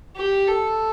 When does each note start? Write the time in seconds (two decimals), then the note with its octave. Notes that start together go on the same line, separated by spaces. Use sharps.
0.16 G4
0.48 A4